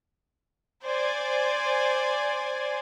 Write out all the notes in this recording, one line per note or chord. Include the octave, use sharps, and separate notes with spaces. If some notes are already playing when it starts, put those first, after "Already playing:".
C5 D5 G#5